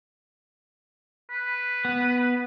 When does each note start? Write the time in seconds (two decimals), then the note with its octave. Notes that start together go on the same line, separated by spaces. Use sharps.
1.30 B4
1.85 B3